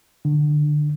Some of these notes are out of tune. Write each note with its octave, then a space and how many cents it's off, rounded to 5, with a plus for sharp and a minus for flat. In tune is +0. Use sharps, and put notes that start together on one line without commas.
D3 +20